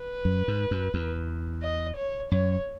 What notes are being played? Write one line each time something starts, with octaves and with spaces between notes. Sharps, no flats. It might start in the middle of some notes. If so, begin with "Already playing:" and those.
Already playing: B4
F#2
G#2
F#2
E2
D#5
C#5
F#2 C#5